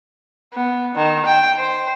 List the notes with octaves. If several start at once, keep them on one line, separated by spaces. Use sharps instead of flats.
B3
D#3
G5
C5